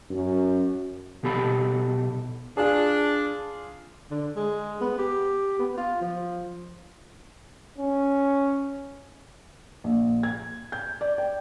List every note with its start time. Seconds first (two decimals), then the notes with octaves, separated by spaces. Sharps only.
0.10 F#2
1.23 B1 B2 G4 A4 B5
2.57 D4 F4 G#4
4.11 D3
4.36 G#3
4.81 B3
4.98 G4
5.59 B3
5.77 F4
6.01 F3
7.78 C#4
9.84 A#1
10.23 G#6
10.72 G6
11.01 D5
11.18 G5